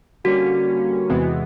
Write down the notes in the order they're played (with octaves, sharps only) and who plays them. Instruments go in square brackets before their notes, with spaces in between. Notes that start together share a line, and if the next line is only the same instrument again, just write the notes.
[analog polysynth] D3 G3 A#3 C#4 [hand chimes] F#4
[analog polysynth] E2 C3 E3 G#3 B3